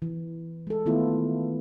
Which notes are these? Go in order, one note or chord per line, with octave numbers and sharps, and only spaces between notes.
E3
G#3 A4
D#3 A3 B3 E4 F4